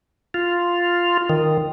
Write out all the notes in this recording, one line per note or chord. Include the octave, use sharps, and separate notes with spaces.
F4
D#3